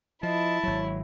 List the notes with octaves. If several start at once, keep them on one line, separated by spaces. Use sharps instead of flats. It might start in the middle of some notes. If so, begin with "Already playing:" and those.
F3 E4 D#5 A5
G#1 F#3 C#5